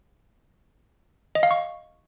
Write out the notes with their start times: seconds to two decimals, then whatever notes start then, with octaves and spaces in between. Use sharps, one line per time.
1.35 D#5
1.43 F5
1.51 C#6